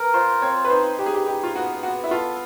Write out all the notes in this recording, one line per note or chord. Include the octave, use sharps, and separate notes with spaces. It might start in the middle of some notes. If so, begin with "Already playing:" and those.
Already playing: A#4 B4
F4 C5
C4 C#5
B4
D#4 C5
D#4 G4
G#4
G4
D#4 G4
F4
B3 F#4
B3 F#4
E4
F4 A4